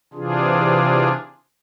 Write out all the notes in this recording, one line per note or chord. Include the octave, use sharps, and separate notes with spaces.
C3 E3 D4 F4 G#4